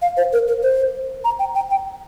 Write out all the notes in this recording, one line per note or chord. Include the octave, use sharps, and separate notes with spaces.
F5
C5
A#4
A#4
C5
A#5
G5
G5
G5